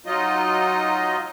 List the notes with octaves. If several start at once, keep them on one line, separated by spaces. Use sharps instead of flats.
F#3 D#4 F4 D#5